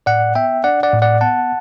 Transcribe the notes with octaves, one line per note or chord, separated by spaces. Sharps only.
A2 D5 F#5
B3 E5 G5
D4 D5 F#5
D5 F#5
A2
D5 F#5
B3 F#5 A5